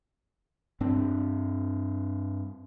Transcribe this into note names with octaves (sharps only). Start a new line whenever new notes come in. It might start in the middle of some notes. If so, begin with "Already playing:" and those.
G2 C4 D4